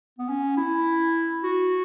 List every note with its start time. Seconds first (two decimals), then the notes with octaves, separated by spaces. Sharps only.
0.18 B3
0.29 C#4
0.57 E4
1.44 F#4